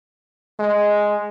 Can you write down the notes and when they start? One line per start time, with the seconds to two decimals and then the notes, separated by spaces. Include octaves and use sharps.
0.59 G#3